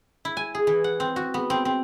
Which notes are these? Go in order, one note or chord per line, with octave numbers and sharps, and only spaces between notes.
E4
G#5
G#4
E3
F#5
C4
F#4
B3
C4
C4